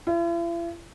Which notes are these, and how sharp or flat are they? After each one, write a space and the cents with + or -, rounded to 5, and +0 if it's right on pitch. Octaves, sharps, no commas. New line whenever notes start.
E4 +45